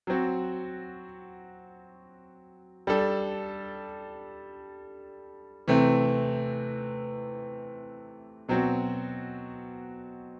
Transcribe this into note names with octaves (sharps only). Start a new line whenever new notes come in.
F#3 C4 F#4
G3 D4 A4
C3 E3 A3 C4
B2 F#3 C4 F#4